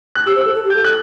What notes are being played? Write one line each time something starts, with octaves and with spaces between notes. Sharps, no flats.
F#6
G4 E6
C5
A4 E6
A4
G4
A4 G6
F#6